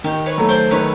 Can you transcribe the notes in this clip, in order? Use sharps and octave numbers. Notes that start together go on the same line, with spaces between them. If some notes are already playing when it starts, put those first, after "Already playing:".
D#3 G4
B4 C#5
F#3 A3
C5 D5
D#3 B4 C#5